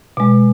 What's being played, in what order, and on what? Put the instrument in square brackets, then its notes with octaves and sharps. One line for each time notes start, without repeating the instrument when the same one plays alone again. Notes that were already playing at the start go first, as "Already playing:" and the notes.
[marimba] B2 G#3